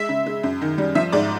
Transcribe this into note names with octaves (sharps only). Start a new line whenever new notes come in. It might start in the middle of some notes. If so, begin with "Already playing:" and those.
Already playing: G#3 E5
C#3
G#3
F#2
D#3
G3
F3 E5
G#2 D5